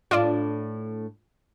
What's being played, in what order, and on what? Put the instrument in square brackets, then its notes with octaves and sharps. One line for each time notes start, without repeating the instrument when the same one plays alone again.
[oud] A2 D4 [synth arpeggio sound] F4 D5